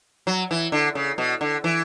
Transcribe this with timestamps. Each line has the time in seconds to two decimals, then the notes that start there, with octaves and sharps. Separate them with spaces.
0.27 F#3
0.51 E3
0.72 D3
0.95 C#3
1.18 B2
1.41 D3
1.64 E3